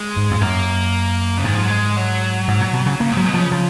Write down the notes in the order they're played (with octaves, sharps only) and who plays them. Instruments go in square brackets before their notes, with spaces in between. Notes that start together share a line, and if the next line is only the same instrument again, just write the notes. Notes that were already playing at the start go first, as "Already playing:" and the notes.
Already playing: [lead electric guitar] G#3
[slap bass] G#2
F2
[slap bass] F#2 [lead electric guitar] A#3
[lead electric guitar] C#3
[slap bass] G#2 [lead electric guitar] D#3
[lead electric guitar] F3
F#3
G#3
F#3
[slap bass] G#2
A#2
B2
C#3
[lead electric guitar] C#3 [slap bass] A#3
[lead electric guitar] F#2
[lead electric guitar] G#2 [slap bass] F#3
[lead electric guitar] B2
[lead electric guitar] C#3 [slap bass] F3
[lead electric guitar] C#3 [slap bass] F3